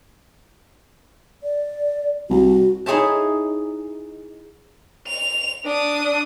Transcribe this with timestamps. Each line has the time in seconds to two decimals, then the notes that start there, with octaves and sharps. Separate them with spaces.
1.43 D5
2.30 C2 F#4
2.86 D#4 E4 G#4 C#5 E5 A5
5.07 F7
5.65 D4 D#6